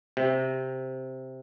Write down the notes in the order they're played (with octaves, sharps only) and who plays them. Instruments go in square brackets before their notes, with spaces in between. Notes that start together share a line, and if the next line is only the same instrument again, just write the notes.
[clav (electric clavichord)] C3